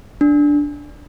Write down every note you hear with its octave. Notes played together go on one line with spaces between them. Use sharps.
D4